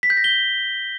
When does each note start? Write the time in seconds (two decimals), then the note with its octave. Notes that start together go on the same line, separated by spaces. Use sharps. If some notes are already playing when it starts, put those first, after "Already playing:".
0.03 B6
0.10 G6
0.17 A#6
0.24 G7